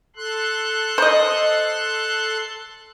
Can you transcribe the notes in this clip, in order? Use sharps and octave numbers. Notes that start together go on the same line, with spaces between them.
A4 C6 F#6
C5 D#5